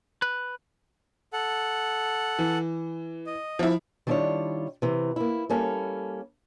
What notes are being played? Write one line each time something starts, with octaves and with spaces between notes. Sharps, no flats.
B4
A4 F#5
E3
D#5
F3 E4
D#3 G3 D4 E4 F4 C#5
C3 E3
A#3 E4
G3 A#3 C#4 A4